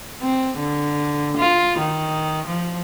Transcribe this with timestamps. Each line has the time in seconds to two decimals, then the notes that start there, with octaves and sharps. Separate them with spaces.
0.22 C4
0.58 D3
1.37 F4
1.79 D#3
2.47 F3